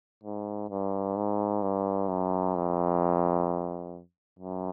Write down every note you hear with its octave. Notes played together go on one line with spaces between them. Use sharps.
G#2
G2
G#2
G2
F#2
F2
F#2